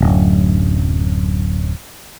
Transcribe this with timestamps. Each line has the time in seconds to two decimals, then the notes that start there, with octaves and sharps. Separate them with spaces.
0.01 D1 F#2